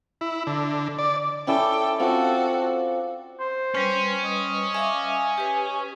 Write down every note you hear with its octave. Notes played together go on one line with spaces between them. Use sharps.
E4
D3
D5
C#4 E4 A4 D5 G5
C4 F4 F#4 A4
C5
G3 C#4 B4
D#5
E5 F5 G#5 D6
G4 B4